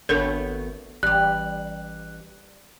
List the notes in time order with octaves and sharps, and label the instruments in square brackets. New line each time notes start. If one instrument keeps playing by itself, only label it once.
[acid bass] G#1 [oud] A3 B3 C#5 [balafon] D4 A4 A#4
[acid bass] A1 [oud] G3 G4 [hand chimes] F#6